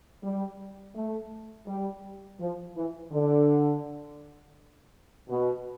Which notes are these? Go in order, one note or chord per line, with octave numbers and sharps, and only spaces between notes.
G3
A3
G3
F3
E3
D3
B2